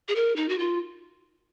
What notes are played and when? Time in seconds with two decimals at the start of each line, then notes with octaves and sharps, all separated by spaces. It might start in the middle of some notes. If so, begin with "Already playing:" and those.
0.09 G#4
0.16 A#4
0.36 D#4
0.49 F#4
0.59 F4